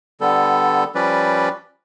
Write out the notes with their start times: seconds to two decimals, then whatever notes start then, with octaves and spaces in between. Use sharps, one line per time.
0.21 D3 G3 B3 A4
0.95 F3 G3 C#4 B4 D5